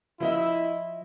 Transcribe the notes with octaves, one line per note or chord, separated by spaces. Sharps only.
F3 E4 D#5 E5